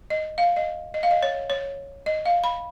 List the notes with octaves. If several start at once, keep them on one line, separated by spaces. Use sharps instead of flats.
D#5
F5
D#5
D#5
F5
D#5
C#5
C#5
D#5
F5
B5